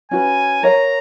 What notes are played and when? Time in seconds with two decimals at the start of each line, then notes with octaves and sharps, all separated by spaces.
0.11 C#4 F#4 B4 G#5
0.63 A#4 C#5 F5 A#5